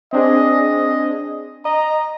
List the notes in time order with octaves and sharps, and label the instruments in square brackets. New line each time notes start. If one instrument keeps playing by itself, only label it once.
[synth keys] C4 D4 G#4 [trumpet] D#5
[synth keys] D#5 [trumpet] A#5